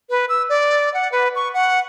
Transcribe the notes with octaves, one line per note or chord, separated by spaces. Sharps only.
B4
E6
D5
F#5
B4
C#6
F#5